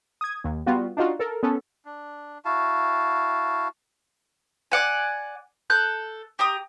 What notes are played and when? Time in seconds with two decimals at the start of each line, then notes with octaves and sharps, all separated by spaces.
0.21 D#6 G#6
0.44 D#2
0.66 G3 B3 F4 F#4
0.97 D4 D#4 F4 F#4
1.19 A4 A#4
1.43 B3 C#4 A4
1.85 D4
2.45 E4 F#4 F5 A5
4.72 D5 F#5 G#5
5.70 A4 F#6 G6
6.39 G4 A#5 D#6